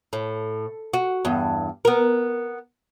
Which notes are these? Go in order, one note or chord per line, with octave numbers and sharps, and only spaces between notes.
A2
F#4
E2 G2
B3 A#4